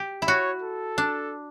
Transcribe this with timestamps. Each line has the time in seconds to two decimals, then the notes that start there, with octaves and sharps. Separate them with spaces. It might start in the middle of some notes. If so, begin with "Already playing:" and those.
Already playing: G4
0.22 E4
0.27 F#4 C#5
0.62 A4
0.98 D4